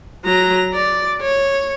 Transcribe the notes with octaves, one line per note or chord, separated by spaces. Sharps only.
F#3 A#5
D5
C#5